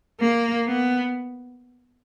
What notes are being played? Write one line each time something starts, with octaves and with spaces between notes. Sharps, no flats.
A#3
B3